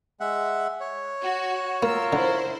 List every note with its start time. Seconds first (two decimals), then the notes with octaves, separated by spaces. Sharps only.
0.20 G#3 E5 F#5
0.80 C#5
1.23 F#4
1.83 A#3 F4 A#4 E6
2.13 D3 E4 C5